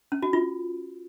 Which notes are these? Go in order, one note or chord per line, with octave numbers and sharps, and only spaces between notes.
C#4
F#4
F4